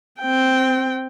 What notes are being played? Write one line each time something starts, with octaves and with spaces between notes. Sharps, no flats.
C4 G5